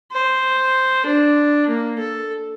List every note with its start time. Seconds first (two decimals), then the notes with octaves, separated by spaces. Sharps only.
0.12 C5
1.05 D4
1.68 A#3
1.99 A4